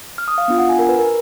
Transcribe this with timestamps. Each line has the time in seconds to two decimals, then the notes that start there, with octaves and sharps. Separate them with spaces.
0.18 F6
0.28 D#6
0.38 F5
0.48 B3 D4 F4
0.59 F#5
0.69 G#5
0.79 A#4
0.89 B4
0.99 A#4